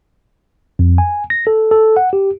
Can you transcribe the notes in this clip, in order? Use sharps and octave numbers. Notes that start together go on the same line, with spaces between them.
F2
G#5
A#6
A4
A4
F#5
G4